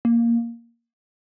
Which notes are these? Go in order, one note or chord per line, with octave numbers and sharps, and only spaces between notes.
A#3